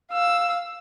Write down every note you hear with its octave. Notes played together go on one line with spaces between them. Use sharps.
F5 E6